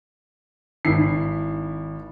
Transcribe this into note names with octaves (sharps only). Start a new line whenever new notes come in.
G#1 E4 C7